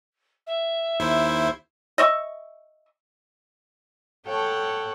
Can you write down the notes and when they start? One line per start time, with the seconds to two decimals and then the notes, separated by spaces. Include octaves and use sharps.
0.46 E5
1.00 D#2 E4 C5
1.98 D#5 E5 C#6
4.27 A4 C#5 F#5 G5 A5